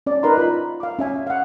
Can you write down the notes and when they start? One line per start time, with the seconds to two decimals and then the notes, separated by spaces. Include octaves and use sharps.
0.06 C#4 D5
0.23 D#4 A#4 B4 D#5 A#5 C6
0.38 F4 B5
0.80 F5 D6
0.99 C#4 E5 G#5
1.27 F5 F#5